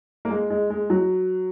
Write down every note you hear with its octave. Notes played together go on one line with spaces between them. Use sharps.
A#3
G#3
G#3
G#3
F#3